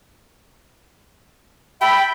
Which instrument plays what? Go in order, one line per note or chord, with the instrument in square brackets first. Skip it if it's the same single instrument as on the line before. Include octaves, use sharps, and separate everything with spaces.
[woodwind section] E5 A5 B5 [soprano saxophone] G5